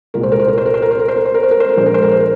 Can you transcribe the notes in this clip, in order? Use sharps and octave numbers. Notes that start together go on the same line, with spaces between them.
C2 A#2 G#3 A#4
C5
A#4
C5
A#4
C5
A#4
C5
A#4
C5
A#4
C5
A#4
C5
A#4
C5
A#4
C5
A#4
A#1 A#2 G#3 C5
A#4
C5
A#4
C5
A#4